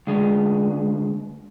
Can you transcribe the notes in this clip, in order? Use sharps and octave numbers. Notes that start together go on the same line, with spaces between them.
D2 G#3